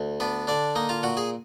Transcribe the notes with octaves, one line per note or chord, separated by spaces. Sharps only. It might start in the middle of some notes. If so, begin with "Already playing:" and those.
Already playing: D2
B3 D4 B4
D3 D4 D5
A#3 D#4 D#5
F4 F5
A#2 F#4 F#5
G#4 G#5